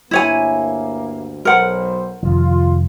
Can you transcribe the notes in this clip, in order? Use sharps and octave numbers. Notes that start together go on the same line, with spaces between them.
D2 G2 A#3 E4 C#5 G#5
B1 A#4 C5 F#5
F2 C3 D#3 F4